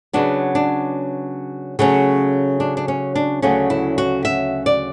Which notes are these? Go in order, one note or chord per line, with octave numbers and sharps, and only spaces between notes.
C#3 F#3 B3 D4
D4
C#3 F#3 A3 C#4
D4
D4
C#4
D4
D2 C#3 F#3 A3 C#4
E4
F#4
E5
D5